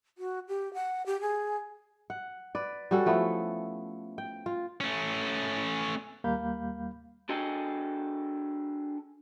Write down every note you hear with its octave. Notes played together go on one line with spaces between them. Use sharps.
F#4
G4
F#5
G4
G#4
F#5
B4 D5
G3 C#4 F#4 A4
F3 A3 B3 E4
G5
F4
A3 C#4
D#2 G3 A#3 F5 B5 G6
D4 F#4 G#4 A4 D#5 G5